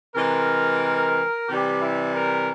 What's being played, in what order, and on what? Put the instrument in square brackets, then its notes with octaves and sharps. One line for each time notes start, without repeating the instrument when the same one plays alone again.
[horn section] C3 E3 G#3 A#4
C3 E3 G3 G4
E4
A#4